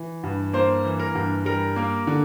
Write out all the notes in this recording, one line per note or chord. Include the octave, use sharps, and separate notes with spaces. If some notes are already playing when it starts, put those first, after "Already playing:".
Already playing: E3
G2
A#3 C5
E3
A#4
G2
G3 A#4
A#3
D3